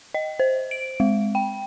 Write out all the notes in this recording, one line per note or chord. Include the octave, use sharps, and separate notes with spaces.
D#5
C5
D7
G#3
G5